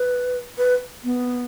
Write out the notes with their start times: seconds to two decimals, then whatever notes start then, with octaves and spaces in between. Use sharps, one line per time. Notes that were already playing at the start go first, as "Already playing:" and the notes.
Already playing: B4
0.58 B4
1.04 B3